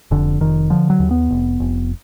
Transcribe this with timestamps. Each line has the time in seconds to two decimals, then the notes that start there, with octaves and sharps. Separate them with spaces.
0.11 F1 D3
0.41 F1 D#3
0.70 D3 F3
0.90 F#3
1.00 D#2
1.11 B3
1.31 F1
1.60 F1